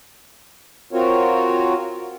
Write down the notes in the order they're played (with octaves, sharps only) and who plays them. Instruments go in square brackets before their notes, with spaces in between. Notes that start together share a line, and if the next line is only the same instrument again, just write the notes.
[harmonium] C4 F4 F#4 A#4 C#5